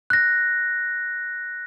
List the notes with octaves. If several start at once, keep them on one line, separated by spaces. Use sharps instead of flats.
F#6 A#6